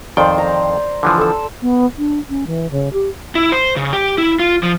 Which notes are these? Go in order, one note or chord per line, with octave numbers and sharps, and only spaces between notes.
F2 D#3 C5 D5 G5
A#5
D3 E3 F3
A4 E6
B3
D4
C#4
E3
C#3
G4
E4
C5
C#3
G4
E4
F4
F3